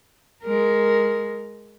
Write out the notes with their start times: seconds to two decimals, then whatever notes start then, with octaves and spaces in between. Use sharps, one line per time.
0.44 G#3 A#4